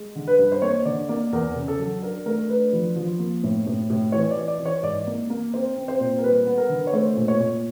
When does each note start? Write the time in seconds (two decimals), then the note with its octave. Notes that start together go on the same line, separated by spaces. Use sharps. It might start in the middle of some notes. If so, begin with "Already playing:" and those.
Already playing: G#3
0.15 D3
0.27 B4
0.39 G2
0.52 C5
0.62 A#3 C#5
0.85 D3 D5
1.09 A#3 D5
1.32 E2 A#4
1.55 C#3
1.68 A4
1.79 F#3
2.02 D4 A#4
2.26 A3 A#4
2.49 D4 B4
2.73 F3
2.96 F3
3.19 A#3
3.43 A2
3.67 A2
3.90 A2
4.12 E3 C#5
4.31 D5
4.37 E3
4.48 D5
4.60 E3
4.65 C#5
4.82 G#2 D5
5.07 A#3
5.30 A#3
5.53 C4 C5
5.76 C4
5.88 C5
6.00 A#2
6.18 A#4
6.24 G3 B4
6.47 B3
6.58 A#4
6.69 D3
6.87 C#5
6.93 A3 C5
7.17 A#2
7.28 C#5
7.39 A#2